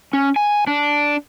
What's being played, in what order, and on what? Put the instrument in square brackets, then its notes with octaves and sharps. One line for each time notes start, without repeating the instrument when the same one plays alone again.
[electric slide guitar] C#4
G#5
D4